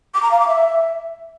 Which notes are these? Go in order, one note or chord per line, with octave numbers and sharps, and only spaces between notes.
D6
A#5
F5
D6
E5